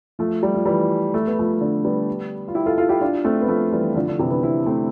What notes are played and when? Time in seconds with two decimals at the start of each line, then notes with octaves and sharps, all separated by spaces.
0.19 F3 A3
0.43 G3
0.55 F3
0.66 E3 G3
1.14 A3
1.27 B3
1.39 F3 A3
1.61 D3
1.85 G3 B3
2.48 F4
2.55 E4 G4
2.66 F4 A4
2.78 F4 A4
2.89 E4 G4
3.01 D4 F4
3.24 A3 C4
3.41 B3
3.48 F3 A3
3.72 E3 G3
3.95 D3 F3
4.08 D3
4.19 C3 E3
4.30 B3 D4
4.43 C4 E4
4.66 A3 C4